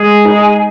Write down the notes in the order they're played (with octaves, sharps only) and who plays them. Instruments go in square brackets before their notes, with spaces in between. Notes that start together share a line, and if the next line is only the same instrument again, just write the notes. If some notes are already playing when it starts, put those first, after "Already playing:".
Already playing: [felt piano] G#3 [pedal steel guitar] G#4
[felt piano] D#4